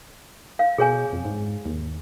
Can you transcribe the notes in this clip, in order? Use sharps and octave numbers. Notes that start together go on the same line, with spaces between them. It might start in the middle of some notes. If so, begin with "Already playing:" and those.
F5
B2 G#4 C#5 G#5
F2
G#2
D#2